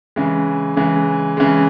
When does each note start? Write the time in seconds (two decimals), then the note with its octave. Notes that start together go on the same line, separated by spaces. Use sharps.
0.16 C#3 E3 G#3
0.76 C#3 E3 G#3
1.37 C#3 E3 G#3